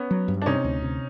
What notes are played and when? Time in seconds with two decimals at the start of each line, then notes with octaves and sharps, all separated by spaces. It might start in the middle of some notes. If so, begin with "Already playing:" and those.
Already playing: B3 C#4
0.11 F#3
0.28 G2
0.42 D4
0.46 C3 C#4 D#4
0.64 D2
0.82 C3